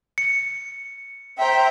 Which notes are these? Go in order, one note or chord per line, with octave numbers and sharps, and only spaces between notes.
C#7
C5 E5 G5 A#5